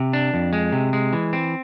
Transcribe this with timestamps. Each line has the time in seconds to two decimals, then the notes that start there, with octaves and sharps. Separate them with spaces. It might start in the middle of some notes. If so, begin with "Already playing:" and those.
Already playing: C3
0.13 D4
0.34 F2
0.53 G#3
0.73 C3
0.93 G#3
1.13 E3
1.33 C4